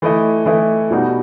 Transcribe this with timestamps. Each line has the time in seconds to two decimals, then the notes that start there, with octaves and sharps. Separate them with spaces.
0.02 E3 A3 E4 A4 D#5
0.46 E3 A3 E4 A4 D#5
0.91 B2 G3 D#4 F#4